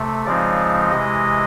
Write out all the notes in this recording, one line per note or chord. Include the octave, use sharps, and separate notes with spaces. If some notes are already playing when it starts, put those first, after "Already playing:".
Already playing: C3 A3
C#3 F3 G#3 C4 D#4 D5
C3 E3 G#3 D#5